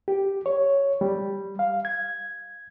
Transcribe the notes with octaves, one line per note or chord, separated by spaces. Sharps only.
G4
C#5
G3
F5
G#6